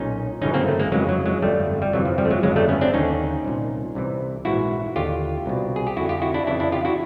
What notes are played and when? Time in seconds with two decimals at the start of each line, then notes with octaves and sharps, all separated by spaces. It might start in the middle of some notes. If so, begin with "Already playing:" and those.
Already playing: B1 A#2 C#4 D#4
0.41 G1 F#2 C#3 E3 C#4 D#4
0.54 A#3 C4
0.68 A3
0.79 G#3 A#3
0.92 F2 C#3 E3 F#3 G#3
1.09 F#3
1.26 F#3 G#3
1.42 G1 F2 D3 G3 A3
1.82 G3
1.93 G1 F2 C3 E3 F#3
2.05 F3
2.18 F3 G3
2.25 A3
2.31 F#3 G#3
2.43 G1 F2 C#3 E3 F#3 G#3
2.56 G3 A3
2.69 B3 C#4
2.81 C4 D4
2.94 D#2 D3 C#4 D#4
3.44 C2 A#2
3.95 C2 C3 E3
4.45 A#1 G#2 E3 E4 F#4
4.96 D#2 D3 F4 G4
5.46 C2 B2
5.76 G#4
5.87 G4
5.97 F2 D3 E4 F#4
6.09 F4 G4
6.22 E4 F#4
6.34 D4 E4
6.47 F2 C#3 E3 D4 E4
6.60 D4 E4
6.72 F4 G4
6.85 E4 F#4